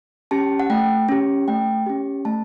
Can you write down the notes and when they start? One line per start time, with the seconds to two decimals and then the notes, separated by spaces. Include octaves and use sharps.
0.31 C#4 G4 A5
0.60 F#5
0.70 A3 G5
1.09 C#4 G4
1.48 A3 G5
1.86 C#4 G4
2.25 A3 A5